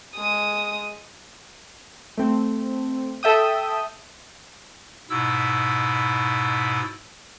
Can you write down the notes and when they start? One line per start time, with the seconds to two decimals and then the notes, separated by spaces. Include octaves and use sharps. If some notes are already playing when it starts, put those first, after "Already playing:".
0.15 G#3 D#6
2.18 A3 C4
3.23 A4 E5 G5 D#6
5.09 G#2 B2 E4 E6